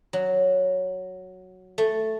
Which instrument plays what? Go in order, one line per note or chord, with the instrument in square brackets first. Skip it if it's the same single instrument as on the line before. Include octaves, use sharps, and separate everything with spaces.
[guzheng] F#3
A3